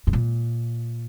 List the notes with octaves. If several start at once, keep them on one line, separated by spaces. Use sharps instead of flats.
G#2
A#2